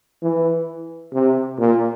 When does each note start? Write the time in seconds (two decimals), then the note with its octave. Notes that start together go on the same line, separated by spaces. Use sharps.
0.22 E3
1.13 C3
1.59 A#2